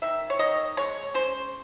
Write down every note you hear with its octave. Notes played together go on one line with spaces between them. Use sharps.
D#3 E5
C#5
D#3 D#5
G#3 C#5
C#4 C5